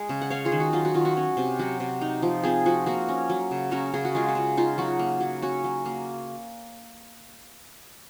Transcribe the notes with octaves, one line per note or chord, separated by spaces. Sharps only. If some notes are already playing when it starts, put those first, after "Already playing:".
Already playing: G#3 D#5
C#3
F#5
C#4 C#5 F5
F4 G#4
D#3
F#4
F#3 F4
F#4
D#3 F4
F#4
C#4
C3
F#3 F#4
C3
D#4
F3
C4 F4 G#4
F3 F#4
A#3 F#4 A#4
C#4
F#3
C#3
C#4 F#4 A#4
C#3 G#4
F#4
G#3 F4
F#4
C#3
D#4 F4
F#3 F#4
A#3
F#3
C#4 F#4
F#3
A#3